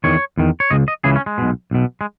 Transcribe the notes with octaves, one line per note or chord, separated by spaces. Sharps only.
E2 D#3 C#5
E2 D#3
C#5
C#2 C#3 D#5
D#5
C#2 C#3 E3 G#4
C#4
G#3
B1 B2
B1 B2
G#3